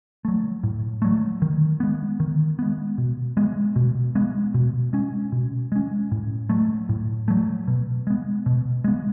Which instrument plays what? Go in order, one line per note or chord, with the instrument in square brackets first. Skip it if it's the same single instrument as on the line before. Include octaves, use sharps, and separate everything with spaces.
[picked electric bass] F#3 A3
A2
F#3 A3
D#3
G#3 B3
D#3
G#3 B3
B2
G#3 B3
B2
G#3 B3
B2
G#3 C#4
B2
G#3 C#4
A2
F#3 A3
A2
F#3 A3
B2
G#3 B3
B2
G#3 B3